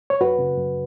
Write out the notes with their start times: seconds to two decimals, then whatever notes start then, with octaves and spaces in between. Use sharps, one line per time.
0.10 C#5
0.21 F#2 F#4 B4
0.39 C#3
0.57 F#2